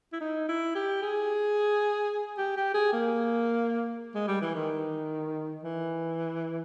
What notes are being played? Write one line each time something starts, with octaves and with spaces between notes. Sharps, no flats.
E4
D#4
E4
G4
G#4
G4
G4
G#4
A#3
G#3
G3
E3
D#3
E3